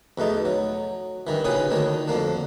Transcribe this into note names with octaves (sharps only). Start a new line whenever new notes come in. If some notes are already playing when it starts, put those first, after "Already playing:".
E2 B2 A3 D#4
F#3
G2 D#3 E3
B1 A#2 C#3 G#4 B4 D#6
D2 D#3 D4 C#5
F2 D3 A#3 D4